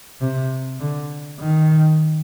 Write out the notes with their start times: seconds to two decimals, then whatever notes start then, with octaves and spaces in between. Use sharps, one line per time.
0.21 C3
0.80 D3
1.39 D#3